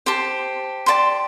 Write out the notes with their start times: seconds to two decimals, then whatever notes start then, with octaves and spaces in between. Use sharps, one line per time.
0.06 G4 C5 A5
0.86 G4 D5 A5 C6